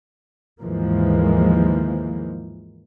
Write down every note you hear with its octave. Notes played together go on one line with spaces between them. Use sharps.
D#2 G#2 E3 F3 G#3 A#3